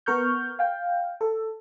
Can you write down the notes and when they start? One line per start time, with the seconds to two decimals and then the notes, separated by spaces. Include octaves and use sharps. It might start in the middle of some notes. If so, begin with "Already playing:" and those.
0.06 B3 A#4 C#6 F6 G6
0.59 F5 G5
1.21 A4